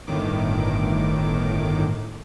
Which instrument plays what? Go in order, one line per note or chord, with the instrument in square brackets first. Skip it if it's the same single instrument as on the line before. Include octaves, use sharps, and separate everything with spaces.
[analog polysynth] G1 A2 D#3 D6